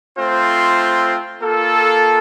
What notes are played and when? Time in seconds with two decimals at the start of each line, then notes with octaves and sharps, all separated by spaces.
0.17 A3 C4 F4 C5
1.41 A#3 F4 A4